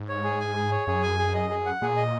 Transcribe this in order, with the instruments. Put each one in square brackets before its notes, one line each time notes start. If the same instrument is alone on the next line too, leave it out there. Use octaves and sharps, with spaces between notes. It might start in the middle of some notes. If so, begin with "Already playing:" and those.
Already playing: [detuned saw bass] G#2
[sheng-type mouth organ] C#5
G#4
G#5
G#4
C#5
[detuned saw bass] F#2 [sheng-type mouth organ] G#4
[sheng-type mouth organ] G#5
G#4
D#5
G#4
F#5
[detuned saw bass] A#2 [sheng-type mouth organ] G#4
[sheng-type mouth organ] D#5